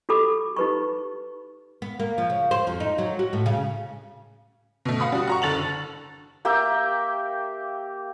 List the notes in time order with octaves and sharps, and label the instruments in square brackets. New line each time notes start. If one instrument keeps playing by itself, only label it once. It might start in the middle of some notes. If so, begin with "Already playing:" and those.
[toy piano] F#4 G4 A4 B5 D6
D#4 G4 B4 B5 C#6
[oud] B3
A#3
F3
C#3
C5
F2
D#4
F#3
F#4
A2
C#3
[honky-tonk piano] B2 A3
F5 F#5 B5 D#6
G3 F#4
F#5 A#5 C#6
F#1 A4 A6 F7 F#7
D3
[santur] A#3 G4 E5 G5